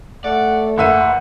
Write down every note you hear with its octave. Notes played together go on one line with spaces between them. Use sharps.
A3 D5 F#5
F#1 E3 E5 F#5 D#7